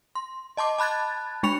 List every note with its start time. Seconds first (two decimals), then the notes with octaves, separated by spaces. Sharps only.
0.15 C6
0.57 D#5 A5 C6 D6
0.78 A5 B5 F#6 G#6 A6
1.43 G#3 D4 B5 C#6 C#7 F7